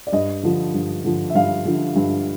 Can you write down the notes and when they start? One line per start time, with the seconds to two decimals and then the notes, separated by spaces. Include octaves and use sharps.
0.07 D5
0.13 G2 D#5
0.43 D3 F3
0.74 G2
1.04 D3 F3
1.30 E5
1.35 G2 F5
1.65 D3 F3
1.96 G2